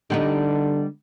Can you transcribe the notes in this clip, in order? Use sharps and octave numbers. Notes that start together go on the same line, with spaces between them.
D3 G3 B3 D#4